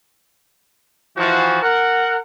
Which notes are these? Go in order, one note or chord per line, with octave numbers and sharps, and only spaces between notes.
E3 F3 F#4
A#4 F#5